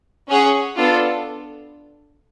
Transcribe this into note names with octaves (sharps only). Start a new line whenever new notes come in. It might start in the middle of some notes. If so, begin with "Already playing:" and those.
C#4 G#4 C#5 F#5
B3 D4 F4 A4